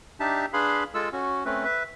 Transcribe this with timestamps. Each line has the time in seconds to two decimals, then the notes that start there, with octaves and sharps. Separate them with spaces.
0.20 D4 D#4 G4 E5 A5
0.53 D4 G#4 B4 F5 B5 C6
0.94 G#3 F4 A4 E6
1.13 C#4 F#4
1.45 A3 C4 C#4 B4
1.64 B4 E5